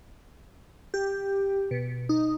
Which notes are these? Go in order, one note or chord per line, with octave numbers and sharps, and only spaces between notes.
G4
B2
D#4